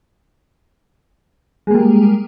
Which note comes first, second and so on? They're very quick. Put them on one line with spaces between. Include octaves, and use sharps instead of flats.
G#3 A#3 G3